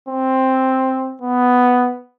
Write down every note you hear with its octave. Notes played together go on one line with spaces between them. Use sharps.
C4
B3